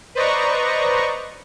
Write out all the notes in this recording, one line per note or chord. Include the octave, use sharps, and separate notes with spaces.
B4 C5 D5 D#5 A#5 C#6